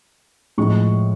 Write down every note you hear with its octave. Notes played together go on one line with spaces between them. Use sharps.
A2 F3 G#3 C#6